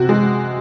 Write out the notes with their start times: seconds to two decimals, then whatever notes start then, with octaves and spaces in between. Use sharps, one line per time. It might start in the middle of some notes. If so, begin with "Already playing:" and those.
Already playing: C3 F#4
0.09 G#3